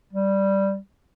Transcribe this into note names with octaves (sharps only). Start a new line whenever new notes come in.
G3